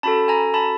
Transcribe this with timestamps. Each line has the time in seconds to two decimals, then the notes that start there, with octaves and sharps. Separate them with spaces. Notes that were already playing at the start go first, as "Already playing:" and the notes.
0.03 C#4 F#4 A4 A5 B5
0.28 G#5 A#5
0.54 A5 B5